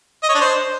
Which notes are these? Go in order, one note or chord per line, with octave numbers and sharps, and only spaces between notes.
D#5
C#5
D4
C5